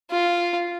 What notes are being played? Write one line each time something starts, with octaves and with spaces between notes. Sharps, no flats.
F4